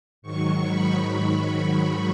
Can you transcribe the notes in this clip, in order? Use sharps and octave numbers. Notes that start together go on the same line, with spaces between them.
G#2 D#3 F#3 C#6
B5
C#6